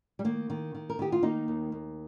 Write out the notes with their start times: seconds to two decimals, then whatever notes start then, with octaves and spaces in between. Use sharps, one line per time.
0.19 G3
0.25 D#3 A#3
0.50 D#3
0.75 D#3
0.90 A#4
0.99 D#3 G4
1.12 F4
1.22 D#3 A#3 D#4
1.48 D#2
1.72 D#2